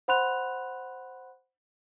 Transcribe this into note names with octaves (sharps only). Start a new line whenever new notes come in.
C5 F#5 B5 C6 F#6 F7